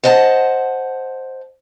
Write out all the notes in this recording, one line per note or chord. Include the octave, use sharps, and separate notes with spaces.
C5 D#5 F#5 G#5 A5